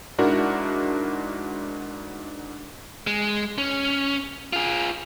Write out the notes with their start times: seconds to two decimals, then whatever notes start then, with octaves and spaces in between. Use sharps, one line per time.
0.18 G#2 D4 E4 F#4 A#4
3.07 G#3
3.58 C#4
4.53 F4 G#4